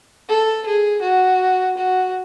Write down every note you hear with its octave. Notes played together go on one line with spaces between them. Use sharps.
A4
G#4
F#4
F#4